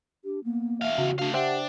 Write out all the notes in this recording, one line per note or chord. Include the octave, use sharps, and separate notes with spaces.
D4 G4
A#3 B3
E2 E5 F5
C#3 F#4
A3 D4 F#4 F5
D4 G4 C5 E5 F#5 G5